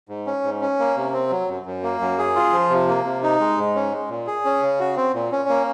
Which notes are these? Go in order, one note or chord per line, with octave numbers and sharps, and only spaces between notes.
G#2
C#4
G#2
C#4
A#3
C3
C4
F#3
F#2
F#2
A#3
F#2
G#4
F4
F3
C3
A#3
C3
D#4
G#3
G#2
C#4
G#3
A#2
G#4
C#4
C#3
F#4
C4
A#2
C#4
A#3